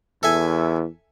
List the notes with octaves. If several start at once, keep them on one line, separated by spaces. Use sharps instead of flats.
E2 A4 E5 G#5